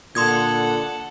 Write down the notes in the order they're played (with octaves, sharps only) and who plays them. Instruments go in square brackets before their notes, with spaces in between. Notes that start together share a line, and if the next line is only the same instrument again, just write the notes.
[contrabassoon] A#2 [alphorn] D3 [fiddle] A4 F#5 [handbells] C6 D#6 G#6